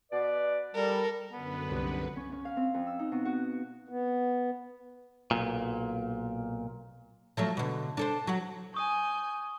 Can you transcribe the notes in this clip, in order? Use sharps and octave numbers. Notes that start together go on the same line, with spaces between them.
B2 B4 D5
G3 A4 A#4
F#2 D3 B3 B4
C2
C#4
C#4
F5
C4
F2
E6
D#4
B2
F#4
B3
B1 A#2
F3 F#3 A3
B2 D3
D4 A4 C5
F#3 F#4
G#5 C#6 D#6 G6